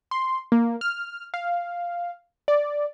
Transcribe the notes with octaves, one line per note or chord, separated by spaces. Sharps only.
C6
A#3
F6
F5
D5